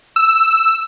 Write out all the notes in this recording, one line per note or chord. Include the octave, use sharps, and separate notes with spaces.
E6